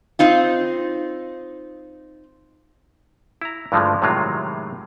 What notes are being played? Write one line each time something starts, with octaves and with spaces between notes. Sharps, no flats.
C4 D#4 F4
E4 A#5
G2 D3 E3 F3 G#3 A3
A2 C3 D#3 F#3 G#3 F4